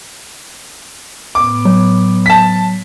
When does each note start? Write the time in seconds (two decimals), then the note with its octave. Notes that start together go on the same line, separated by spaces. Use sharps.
1.35 A2 B3 D6
1.65 F#3
2.26 A5 B6